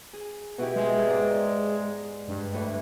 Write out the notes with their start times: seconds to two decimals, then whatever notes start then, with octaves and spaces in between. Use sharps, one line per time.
0.13 G#4
0.58 B2 E4 G4
0.76 G#3
1.07 G#2 D5 A#5
2.28 G2
2.53 D2 A2 E3